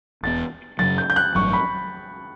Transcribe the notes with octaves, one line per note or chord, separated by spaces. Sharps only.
E1 E2 B2 A6
F#2 C#3 F#3 A6
G6
G6
F#6
A1 G2 F#3 C#6
B5